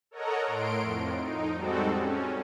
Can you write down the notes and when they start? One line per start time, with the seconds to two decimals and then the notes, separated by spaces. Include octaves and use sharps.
0.11 A4 A#4 C#5 D#5 F#5 A#5
0.46 A2 C6 D7
0.81 F2
1.17 D#4
1.55 G3 G#3 C4 F#4 A4
1.96 C#4